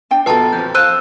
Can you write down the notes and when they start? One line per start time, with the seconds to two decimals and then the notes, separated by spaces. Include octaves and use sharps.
0.11 D4 G5 A5
0.26 A#1 B2 F4 A4 B4 A5 A#5
0.53 F2 F3 G6
0.75 C5 F5 E6 F#6 D#7